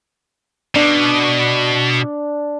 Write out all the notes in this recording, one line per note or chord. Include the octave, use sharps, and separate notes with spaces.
B2 D4